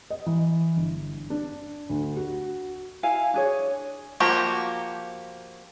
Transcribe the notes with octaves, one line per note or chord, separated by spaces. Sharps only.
D#5
E3
G1
D4
D2
F#4
E4 F5 G#5
D4 G#4 C#5
F3 A#3 F#4 G4